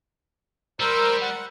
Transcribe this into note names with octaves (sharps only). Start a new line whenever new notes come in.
G3 A#4 C5 E6
F#5